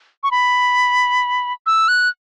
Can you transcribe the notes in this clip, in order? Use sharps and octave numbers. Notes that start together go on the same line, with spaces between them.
C#6
B5
E6
F#6